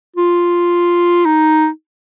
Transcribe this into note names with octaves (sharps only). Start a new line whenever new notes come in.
F4
D#4